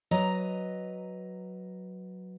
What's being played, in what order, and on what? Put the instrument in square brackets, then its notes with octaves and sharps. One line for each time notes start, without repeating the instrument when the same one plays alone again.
[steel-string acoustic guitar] F#3 B4 D#5 A#5